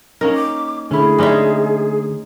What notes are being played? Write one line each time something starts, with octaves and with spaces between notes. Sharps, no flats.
A#3 C#4 D#4 A#4
D6
D3 A3 C#4 E4 G#4
G#3 C#4 D#4 G4 D5 E5